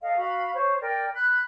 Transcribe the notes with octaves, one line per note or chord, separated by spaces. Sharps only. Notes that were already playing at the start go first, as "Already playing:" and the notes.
A4 D#5 F5 F#5
F#4 F5 B5
C5 C#5 C#6
A#4 D5 G5
B5 F#6